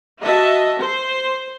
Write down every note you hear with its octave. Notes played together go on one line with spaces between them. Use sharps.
F#4 D#5 E5 A5
C5